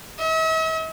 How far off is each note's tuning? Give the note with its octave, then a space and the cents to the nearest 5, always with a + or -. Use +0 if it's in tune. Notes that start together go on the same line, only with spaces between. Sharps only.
E5 -45